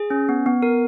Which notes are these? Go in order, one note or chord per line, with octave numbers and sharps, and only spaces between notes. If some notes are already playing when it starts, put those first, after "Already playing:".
Already playing: G#4
C#4
B3
B3
A#4